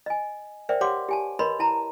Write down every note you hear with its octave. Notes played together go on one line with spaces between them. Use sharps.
D#5 G#5
A#4 C5 D5 E5 G5
G4 C#5 F5 F#5 C6 D6
G4 G#5 A5
A#4 B4 C#5 D#5 B5 C6
E4 A5 A#5